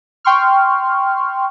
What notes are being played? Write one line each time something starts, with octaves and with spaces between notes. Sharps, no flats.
G5 C6 C#6 F6